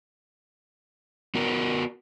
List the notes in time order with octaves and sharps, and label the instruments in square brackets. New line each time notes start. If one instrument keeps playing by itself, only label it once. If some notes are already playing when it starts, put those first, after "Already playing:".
[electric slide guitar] B3 F#4 A#4